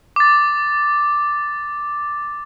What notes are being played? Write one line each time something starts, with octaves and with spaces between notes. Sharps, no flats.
D6 A6